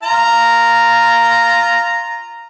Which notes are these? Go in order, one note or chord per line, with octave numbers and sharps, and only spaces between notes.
F4 A#5